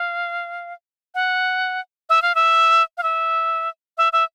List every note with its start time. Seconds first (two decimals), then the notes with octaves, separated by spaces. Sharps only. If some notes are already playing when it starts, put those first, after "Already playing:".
Already playing: F5
1.15 F#5
2.09 E5
2.22 F5
2.35 E5
2.97 F5
3.03 E5
3.98 E5
4.13 E5